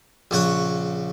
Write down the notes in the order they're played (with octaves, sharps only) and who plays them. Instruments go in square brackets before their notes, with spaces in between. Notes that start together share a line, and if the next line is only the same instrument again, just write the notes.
[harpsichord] A#1 C#3 C#5 F#5 C#6